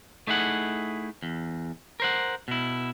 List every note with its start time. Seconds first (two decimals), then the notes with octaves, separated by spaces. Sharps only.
0.27 A3 D#4 E4 G#4 F#5
1.23 E2
2.00 A#4 C5 F#5
2.48 B2 E4